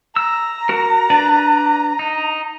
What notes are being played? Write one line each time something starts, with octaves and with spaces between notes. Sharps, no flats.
A#5 E6
F#4 A#4
D4 B4 D5
D#4